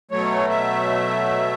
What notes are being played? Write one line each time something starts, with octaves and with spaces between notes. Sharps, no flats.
B2 F#3 A3 C#5
E5